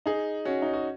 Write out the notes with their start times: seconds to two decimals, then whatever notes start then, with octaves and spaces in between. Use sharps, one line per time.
0.06 D#4 G#4
0.45 C#4 F#4
0.62 D#4
0.73 F#4